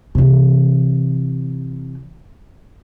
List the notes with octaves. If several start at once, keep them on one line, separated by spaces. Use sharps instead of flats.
C3 E3